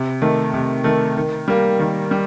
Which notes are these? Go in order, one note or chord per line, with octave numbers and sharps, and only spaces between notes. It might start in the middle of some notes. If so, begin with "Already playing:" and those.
Already playing: C3
D#3 A3
C3
D#3 A3
D#3
G3 A#3
D#3
G3